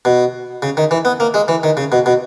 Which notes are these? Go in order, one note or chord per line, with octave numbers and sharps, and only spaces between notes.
B2
C#3
D#3
E3
B3
A#3
G#3
E3
D#3
C#3
B2
B2